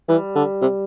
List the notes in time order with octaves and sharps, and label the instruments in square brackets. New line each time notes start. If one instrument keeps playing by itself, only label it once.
[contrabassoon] E3 [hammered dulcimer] G3
[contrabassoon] D3
C3